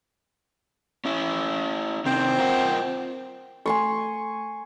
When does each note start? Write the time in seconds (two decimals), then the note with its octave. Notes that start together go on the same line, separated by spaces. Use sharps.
1.05 C#4 E4
2.05 C3 D#3 C4
2.39 F4 A#4 F#5
3.66 A3 A4 G#5 C6 C#6